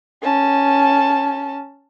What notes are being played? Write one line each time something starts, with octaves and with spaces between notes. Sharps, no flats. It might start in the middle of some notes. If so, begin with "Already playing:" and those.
C#4 A5